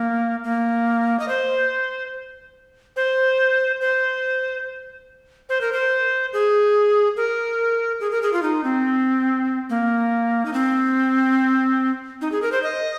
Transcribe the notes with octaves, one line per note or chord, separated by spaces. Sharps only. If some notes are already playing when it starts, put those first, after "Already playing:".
Already playing: A#3
A#3
D#5
C5
C5
C5
C5
A#4
C5
G#4
A#4
G#4
A#4
G#4
F4
D#4
C4
A#3
D#4
C4
D#4
G#4
A#4
C5
D#5